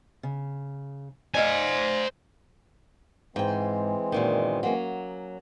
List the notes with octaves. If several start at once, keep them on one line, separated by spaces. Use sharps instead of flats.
C#3
C5 D5 D#5 F5 G#5
G#2 E3 G#3 C4 G5
F#2 A#2 D#3
F#3 A#3 C#4